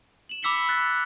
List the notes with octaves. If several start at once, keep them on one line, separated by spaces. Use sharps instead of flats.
E7 F#7
B5 D6 E6 B6 C#7 G7
F#6 A6 B6